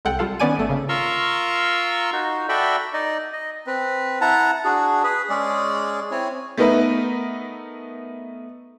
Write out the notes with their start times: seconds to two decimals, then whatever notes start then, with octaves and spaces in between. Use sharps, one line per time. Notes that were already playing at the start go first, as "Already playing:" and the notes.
0.05 C2 G#3 A4 F#5 G5
0.19 G3 F4 A4 F5
0.40 D#3 B3 C#4 D5 G#5 D#7
0.57 G#1 A3
0.69 C#3 A#3
0.89 F4 A#4 A#5 C6 C#6 E6
2.13 D#4 F#4
2.49 F#4 A4 D5 E5 G5 B5
2.93 D#4 D5 D#5
3.33 D#5
3.67 C4 B4
4.21 E4 F#5 A5 A#5
4.65 D4 F#4 G#4
5.04 G#4 B4
5.30 G#3 C#4 G#4 D5
6.11 C4 E4 C#5 G#5
6.57 A3 B3 D#4 A#4 B4 E5